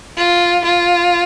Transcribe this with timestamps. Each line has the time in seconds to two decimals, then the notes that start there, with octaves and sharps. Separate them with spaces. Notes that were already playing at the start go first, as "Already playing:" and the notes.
0.17 F4
0.65 F4